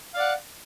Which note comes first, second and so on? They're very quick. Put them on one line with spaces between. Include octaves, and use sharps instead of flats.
F5 D5 F#5